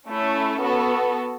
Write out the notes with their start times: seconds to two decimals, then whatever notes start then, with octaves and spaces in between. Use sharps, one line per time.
0.08 A3 C#4 E4 A4
0.61 B3 F#4 A4